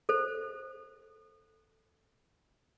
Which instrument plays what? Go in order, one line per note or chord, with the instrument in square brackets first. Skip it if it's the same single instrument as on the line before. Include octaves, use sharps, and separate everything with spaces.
[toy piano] A4 C5